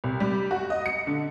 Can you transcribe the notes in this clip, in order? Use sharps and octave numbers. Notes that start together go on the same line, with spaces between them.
C2
G3
F#4
D#5
C#7
D3